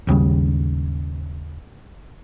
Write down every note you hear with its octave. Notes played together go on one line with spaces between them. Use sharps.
G#1 D#2 C#3 G3